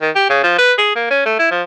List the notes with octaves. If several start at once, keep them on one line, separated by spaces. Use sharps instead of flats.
D#3
G4
C#3
F3
B4
G#4
A#3
C#4
A3
E4
F3